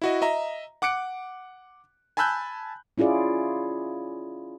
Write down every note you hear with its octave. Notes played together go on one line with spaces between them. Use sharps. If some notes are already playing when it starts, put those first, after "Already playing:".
E4 F#4 D#5
D#5 E5 A#5
F#5 D6 F#6 C#7 D7
G#5 A5 B5 E6 F#6 G6
C#4 E4 F4 G#4 D5